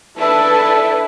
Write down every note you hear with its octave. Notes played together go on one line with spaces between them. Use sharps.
D4 E4 A4 B4 E5